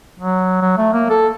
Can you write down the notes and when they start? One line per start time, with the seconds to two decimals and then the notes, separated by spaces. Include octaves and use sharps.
0.19 F#3
0.62 F#3
0.78 A3
0.93 A#3
1.10 A4